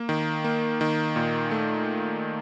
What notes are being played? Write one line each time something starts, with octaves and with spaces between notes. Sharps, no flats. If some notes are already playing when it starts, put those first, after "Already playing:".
Already playing: A#3
D#3
A#3
D#3
A#2
A3